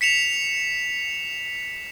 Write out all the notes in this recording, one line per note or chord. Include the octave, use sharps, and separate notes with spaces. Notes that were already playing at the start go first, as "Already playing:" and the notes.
B6 C#7 E7 F7